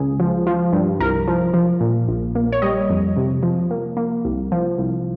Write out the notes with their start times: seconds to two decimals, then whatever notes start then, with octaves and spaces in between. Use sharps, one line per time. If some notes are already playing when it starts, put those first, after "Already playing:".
Already playing: C#2 G#4
0.20 F3
0.47 F3
0.72 G2
1.00 C2 A#4
1.28 F3
1.54 F3
1.81 A#2
2.08 A#1
2.35 A#3
2.52 C#5
2.62 G3 D#5
2.90 F2
3.17 C3
3.43 F3
3.71 A#3
3.97 A#3
4.25 C2
4.52 F3
4.78 C2